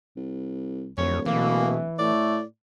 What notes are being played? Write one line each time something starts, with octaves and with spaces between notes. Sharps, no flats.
C2
D1 F2 C#5
B2 E3 A#3
A2 A3 D5